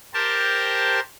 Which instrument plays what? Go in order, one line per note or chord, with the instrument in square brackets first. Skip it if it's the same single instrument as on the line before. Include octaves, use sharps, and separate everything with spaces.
[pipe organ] G4 A#4 C5 A5